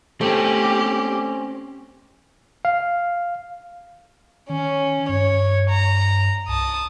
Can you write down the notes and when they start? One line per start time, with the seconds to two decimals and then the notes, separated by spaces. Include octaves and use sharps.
0.21 A3 C4 C#4 G4
2.65 F5
4.49 D#3 C#4
5.09 G2 C#5
5.70 A#5
6.48 C2 A5 D#6